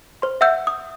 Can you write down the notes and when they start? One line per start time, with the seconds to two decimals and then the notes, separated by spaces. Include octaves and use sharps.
0.22 C5 C6
0.41 E5 F#5 E6 G6
0.67 D#6